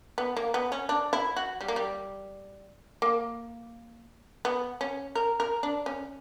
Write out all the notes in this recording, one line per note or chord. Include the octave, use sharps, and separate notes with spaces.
B3
A#3
B3
C#4
D4
E4
F#4
G3
A#3
G3
A#3
B3
C#4
A#4
A#4
D4
C#4